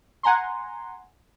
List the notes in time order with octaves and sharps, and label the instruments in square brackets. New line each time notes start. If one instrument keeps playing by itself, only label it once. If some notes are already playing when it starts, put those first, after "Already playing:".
[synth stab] F#5 G#5 A#5 C6